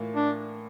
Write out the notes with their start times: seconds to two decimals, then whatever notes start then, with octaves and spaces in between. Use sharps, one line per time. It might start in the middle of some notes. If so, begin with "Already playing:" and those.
Already playing: A2 E3 A#3 F4
0.15 D4